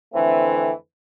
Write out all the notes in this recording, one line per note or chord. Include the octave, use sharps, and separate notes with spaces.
F2 D3 E3 A3 C4